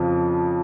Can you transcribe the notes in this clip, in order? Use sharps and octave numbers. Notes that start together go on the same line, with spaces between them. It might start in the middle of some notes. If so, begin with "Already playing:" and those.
Already playing: F2 C#3 F3